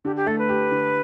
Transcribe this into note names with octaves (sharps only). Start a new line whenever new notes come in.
D3 G4
G4
A3 A4
B4
G4
D3